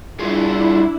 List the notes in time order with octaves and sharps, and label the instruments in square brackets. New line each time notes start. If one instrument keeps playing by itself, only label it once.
[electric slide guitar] G3 F4 G#4 [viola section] D4 E4